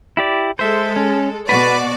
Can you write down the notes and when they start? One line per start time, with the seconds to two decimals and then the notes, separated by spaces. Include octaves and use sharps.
0.17 E4 G4 D5
0.59 G#3 A4 C5 E5
0.96 C#4
1.49 B2 F#4 B4 D5